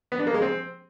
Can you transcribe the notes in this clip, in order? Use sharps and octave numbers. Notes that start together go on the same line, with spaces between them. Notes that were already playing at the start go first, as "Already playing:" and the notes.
B3
D4
A#3
G#3
C4